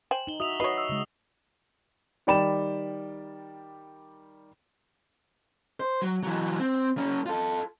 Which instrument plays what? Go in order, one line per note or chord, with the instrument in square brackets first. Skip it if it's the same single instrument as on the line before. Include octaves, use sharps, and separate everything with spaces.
[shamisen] C5 G5 G#5 [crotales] E7 F#7
[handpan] D#4 [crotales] E7 G7
[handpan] F#4 E5 [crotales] D#6 F7
[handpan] F#4 D#5 [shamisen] B4 C#5 [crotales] C7
[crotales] E6
[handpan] C#3 G#3
[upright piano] D#3 G3 D5 G5 B5 E7
[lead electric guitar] C5
F#3
E3 F#3
C4
A#3 C#4
F4 A4